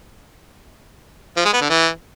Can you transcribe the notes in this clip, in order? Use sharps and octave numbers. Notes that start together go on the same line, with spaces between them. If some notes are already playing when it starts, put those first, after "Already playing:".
F3
G#3
B3
D3
E3